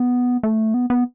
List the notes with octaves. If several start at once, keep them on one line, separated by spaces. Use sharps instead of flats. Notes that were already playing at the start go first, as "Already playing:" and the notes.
Already playing: B3
A3
B3
B3